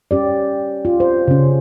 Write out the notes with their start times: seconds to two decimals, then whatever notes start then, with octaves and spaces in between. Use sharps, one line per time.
0.11 C#4 G4 D5
0.85 F4
1.00 C5
1.28 C#3 C#4